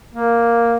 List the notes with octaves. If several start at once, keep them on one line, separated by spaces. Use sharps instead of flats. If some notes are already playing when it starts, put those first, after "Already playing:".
A#3